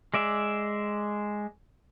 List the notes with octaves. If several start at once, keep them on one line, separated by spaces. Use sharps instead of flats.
G#3 D5 E5